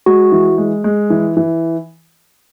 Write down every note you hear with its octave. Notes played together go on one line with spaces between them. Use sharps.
G#3 F#4
E3
G#3
G#3
E3
E3